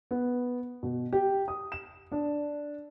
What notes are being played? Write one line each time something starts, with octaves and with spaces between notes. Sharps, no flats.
B3
B2
G4
D#6
E7
D4